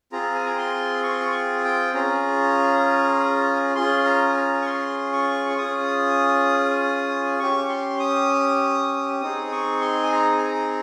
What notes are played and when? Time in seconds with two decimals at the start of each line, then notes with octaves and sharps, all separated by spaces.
0.12 C4 F4 G#4 A#5
0.35 G#5
0.46 A#5
0.58 C6
1.03 C#6
1.11 C6
1.20 C#6
1.64 G5
1.94 C#4 F4 G#4 A#5
3.75 C#4 F4 G#4 C6
4.06 A#5
4.37 A#5
4.62 C#6
4.66 C6
5.13 C#6
5.50 C#6
5.58 C#4 F4 G#4 D#6
7.39 C#4 G4 C#6
7.69 C6
8.00 D#6
9.21 C4 D#4 G#4 D#6
9.52 C#6
9.81 C6
10.03 G#5
10.12 A#5
10.38 G#5
10.42 A#5